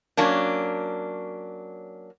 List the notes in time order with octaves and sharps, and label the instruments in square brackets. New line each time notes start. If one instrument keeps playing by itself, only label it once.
[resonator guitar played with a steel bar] F#3 A#3 C#4 D4